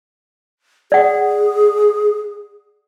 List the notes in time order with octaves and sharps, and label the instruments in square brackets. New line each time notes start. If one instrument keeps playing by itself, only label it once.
[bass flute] G#4 [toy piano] D5 F#5